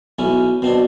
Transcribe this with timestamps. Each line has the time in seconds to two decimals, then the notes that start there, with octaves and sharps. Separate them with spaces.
0.19 B1 C#4 E4
0.62 B2 C4 D4